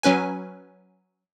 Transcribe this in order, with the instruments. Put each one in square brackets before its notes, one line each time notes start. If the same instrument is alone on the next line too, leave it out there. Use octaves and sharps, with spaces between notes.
[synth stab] F#3 C#4 B4 G#5